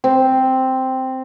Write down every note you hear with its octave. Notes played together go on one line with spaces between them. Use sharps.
C4